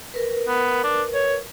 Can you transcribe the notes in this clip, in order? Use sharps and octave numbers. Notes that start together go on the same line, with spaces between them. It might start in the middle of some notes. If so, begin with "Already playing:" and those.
A#4 B4
B3
D4
C#5